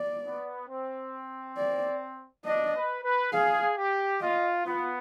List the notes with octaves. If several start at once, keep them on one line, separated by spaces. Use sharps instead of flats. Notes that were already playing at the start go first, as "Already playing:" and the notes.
Already playing: D5
B3
C4
D5
D4 D#5
B4
B4
G#4 F5
G4
F4 D#5
B3 F4